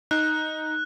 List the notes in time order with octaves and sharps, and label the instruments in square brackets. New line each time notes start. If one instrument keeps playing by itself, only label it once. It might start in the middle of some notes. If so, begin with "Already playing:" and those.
[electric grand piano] D#4 [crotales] F#6